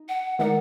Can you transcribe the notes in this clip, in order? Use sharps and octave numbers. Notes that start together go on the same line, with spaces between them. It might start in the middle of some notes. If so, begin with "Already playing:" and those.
Already playing: D#4
F#5
D#3 G#3 D#4 A#4 D5 F#5